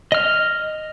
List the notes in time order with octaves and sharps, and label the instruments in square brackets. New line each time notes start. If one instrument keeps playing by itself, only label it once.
[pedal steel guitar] D#5 F6